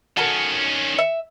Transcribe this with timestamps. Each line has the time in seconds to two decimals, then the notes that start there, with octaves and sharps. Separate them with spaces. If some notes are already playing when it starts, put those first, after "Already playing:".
0.17 D#3 C#4 F#4 A4 A#4
0.99 E5